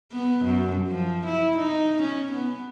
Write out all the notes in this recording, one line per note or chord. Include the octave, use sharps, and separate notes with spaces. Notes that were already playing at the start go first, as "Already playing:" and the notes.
B3
F#2
F3
E4
D#4
C#4
B3